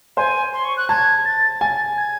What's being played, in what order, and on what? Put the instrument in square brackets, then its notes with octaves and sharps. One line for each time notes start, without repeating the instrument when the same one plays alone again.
[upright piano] C5 [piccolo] G#5
[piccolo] C6
C#6
F#6
[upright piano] A5 [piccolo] G#6
[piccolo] A6
[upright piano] G#5
[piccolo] G#6